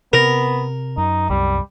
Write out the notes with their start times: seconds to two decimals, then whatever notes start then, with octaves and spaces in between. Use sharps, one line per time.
0.13 C3 B3 A#4
0.97 F#2 D#4
1.30 C2 F#2 G3